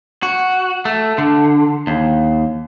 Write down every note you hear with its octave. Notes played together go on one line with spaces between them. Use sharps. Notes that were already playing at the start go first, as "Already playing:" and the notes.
F#4
A3
D3
D#2